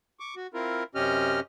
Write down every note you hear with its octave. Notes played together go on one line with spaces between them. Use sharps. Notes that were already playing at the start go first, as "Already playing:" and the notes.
C#6 D6
F#4
C4 E4 F4 A#4
F#2 C3 C#4 G4 D#5 F6